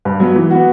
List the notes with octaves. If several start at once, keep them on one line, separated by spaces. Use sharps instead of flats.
G2
F#3 B3
E3
B3 F#4